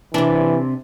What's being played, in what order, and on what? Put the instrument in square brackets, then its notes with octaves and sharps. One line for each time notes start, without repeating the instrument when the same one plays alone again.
[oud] C3 D4 [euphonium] E3